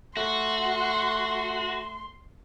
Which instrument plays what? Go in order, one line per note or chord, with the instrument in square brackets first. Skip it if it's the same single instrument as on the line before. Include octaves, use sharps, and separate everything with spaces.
[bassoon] A3 [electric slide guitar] F#4 [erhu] C6